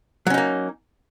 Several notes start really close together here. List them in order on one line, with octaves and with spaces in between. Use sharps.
F#3 C#4 D#4 A#3